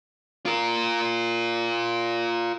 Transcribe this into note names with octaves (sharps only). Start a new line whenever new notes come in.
F4 A#4